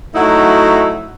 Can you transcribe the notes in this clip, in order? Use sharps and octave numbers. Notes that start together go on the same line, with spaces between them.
F#3 A3 D#4 E4 F#4